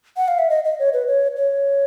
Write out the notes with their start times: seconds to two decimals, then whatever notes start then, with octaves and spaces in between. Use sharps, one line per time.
0.17 F#5
0.28 F5
0.39 E5
0.50 D#5
0.65 D#5
0.79 C#5
0.93 B4
1.07 C#5
1.37 C#5